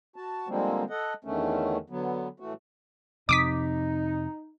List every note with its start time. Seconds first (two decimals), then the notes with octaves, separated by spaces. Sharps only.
0.16 F#4 A5
0.48 D3 F3 G3 G#3 A#3 C4
0.90 A4 D#5 F#5
1.24 E2 D3 D#3 A3 C#4
1.90 D3 F#3 B3
2.40 A2 E3 A3 F#4
3.29 F2 C3 D#4 D6 D#6 B6